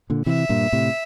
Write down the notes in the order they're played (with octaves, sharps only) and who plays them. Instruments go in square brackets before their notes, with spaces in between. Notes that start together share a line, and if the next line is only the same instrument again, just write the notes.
[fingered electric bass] A#2 D3
[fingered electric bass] C3 E3 [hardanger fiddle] E5
[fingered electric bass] G2 A#2
A2 C3